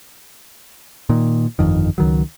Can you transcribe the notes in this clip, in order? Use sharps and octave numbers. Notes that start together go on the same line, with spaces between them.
A#2 D#3
G1 F2 D#3
C#2 D#3 F#3